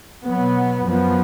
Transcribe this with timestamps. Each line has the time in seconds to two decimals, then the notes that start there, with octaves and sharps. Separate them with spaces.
0.25 B2 F#3 B3
0.83 F#2 F3 B3